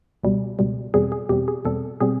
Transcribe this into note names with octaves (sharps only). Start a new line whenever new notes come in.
C#2 B2 G3
C#2 B2 G3
E2 B2 G3 C4 G#4
G#4
E2 B2 G3 C4 G4
G#4
E2 B2 G3 C4 A4
B2 G3 C4 G#4